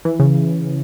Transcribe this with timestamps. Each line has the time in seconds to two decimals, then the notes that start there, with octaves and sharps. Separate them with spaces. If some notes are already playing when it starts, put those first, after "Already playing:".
0.05 E3
0.20 C#3